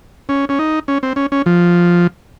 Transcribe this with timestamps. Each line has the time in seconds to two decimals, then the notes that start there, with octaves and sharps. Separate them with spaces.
0.29 C#4
0.49 C#4
0.59 D#4
0.88 C#4
1.03 C4
1.16 C#4
1.32 C#4
1.46 F3